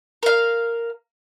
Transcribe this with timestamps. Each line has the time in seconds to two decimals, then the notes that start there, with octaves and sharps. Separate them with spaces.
0.23 A#4 F5